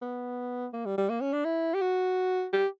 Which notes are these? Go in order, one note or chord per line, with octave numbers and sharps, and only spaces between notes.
B3
A#3
G3
G3
A#3
C#4
D4
E4
G4
F#4
G4